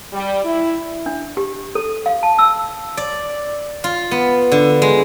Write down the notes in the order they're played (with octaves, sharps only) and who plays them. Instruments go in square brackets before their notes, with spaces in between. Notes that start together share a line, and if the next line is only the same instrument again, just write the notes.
[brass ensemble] G3
E4
[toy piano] D4
G4
A4
F5
A5
E6
[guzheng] D5
F4
B3
D3
G#3